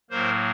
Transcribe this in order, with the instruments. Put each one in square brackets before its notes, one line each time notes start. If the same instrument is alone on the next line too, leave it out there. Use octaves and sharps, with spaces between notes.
[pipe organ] A2 F#3 A#3 A#4 C5